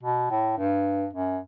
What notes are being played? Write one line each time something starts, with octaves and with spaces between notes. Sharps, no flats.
B2
A2
G2
F#2